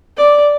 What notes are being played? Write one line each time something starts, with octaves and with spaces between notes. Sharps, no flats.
D5